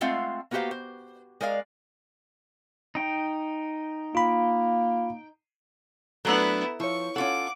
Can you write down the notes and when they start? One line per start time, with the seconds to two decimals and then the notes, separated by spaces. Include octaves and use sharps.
0.01 G#3 A3 C4 F4 F5 F#5
0.51 A#3 B3 F#4 G4 C5 F5
0.71 C5
1.41 G#3 A#4 D5 F5
2.95 D#4 G5
4.15 A#3 F4 B5
6.25 F#3 A3 B3 D4 E4 A4 A#5 E6
6.80 F3 E4 C#5 C#6
7.16 C#4 F4 A4 F#5 D6